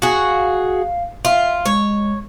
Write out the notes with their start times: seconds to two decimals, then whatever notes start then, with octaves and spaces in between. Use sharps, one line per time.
0.02 F#4 G#4 F5
1.25 F4 E5
1.66 G#3 C#5